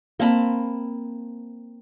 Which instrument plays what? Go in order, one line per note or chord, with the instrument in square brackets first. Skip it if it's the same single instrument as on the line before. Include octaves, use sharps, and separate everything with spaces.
[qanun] A#3 C4 A5 B5